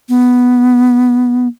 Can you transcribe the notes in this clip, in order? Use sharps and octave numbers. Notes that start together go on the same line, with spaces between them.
B3